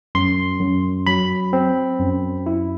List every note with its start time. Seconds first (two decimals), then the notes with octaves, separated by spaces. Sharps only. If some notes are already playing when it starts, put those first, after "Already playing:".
0.15 F#2 C6
0.61 F#2
1.07 F#3 B5
1.53 C4
2.00 F#2
2.46 E4